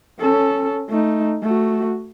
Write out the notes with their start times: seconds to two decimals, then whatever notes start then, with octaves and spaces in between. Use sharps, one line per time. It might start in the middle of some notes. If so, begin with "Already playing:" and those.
0.19 C#4 A4
0.89 A3 D#4
1.42 A3 F#4